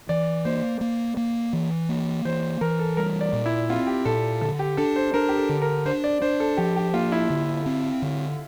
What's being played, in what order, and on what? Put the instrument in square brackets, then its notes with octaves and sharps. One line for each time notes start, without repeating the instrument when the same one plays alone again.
[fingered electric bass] E3 [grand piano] D5
[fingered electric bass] A#3 [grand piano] C5
[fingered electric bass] A#3
A#3
E3
A#3
[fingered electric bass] E3 [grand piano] C5
[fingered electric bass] E3 [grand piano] A#4
[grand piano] A4
[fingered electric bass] G3 [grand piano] A#4
[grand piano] D5
[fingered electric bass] A#2
[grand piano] E4
[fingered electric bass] C4 [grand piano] F4
[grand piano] G4
[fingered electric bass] A#2 [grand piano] A4
[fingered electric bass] D3 [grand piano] A4
[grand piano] G4
[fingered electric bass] D4 [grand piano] A4
[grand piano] C5
[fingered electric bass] D4 [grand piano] A#4
[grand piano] G4
A4
[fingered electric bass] D3
[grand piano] A#4
[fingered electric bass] D4 [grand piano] C5
[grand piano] D5
[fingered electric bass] D4 [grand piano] C5
[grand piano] A4
[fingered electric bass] F3 [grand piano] G4
[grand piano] G4
[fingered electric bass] A#3 [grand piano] F4
[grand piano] E4
[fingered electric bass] D3
C4
D3